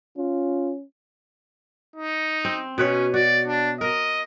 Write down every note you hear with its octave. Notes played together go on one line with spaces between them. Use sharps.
C#4 F4
D#4
C4
B2 C#4 B4 C#5
F#4 D5
D4
A#4 D#5